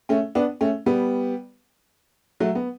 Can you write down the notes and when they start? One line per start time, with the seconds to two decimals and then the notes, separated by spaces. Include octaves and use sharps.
0.09 A3 C#4
0.35 B3 D4
0.61 A3 C#4
0.86 G3 B3
2.40 F#3 A3
2.55 B3